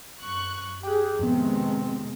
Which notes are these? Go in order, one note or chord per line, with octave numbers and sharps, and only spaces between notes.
F#2 C#6 F#6
G4 G#4 G5 F#6
F2 A2 C3 D#3 G#3 B3 C4